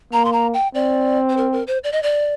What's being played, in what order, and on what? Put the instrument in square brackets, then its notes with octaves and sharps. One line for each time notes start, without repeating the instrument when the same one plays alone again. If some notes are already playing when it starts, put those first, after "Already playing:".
[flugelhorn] A#3 [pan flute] A#5
[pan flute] C6
A#5
G5
[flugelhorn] C4 [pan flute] D5
[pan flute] C5
A#4
A#4
C5
D5
D#5
D5